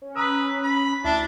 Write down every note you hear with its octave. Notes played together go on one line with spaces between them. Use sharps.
C#4
B4 A#5 D#6 E6
B5
D2 D4 E4 E5 A5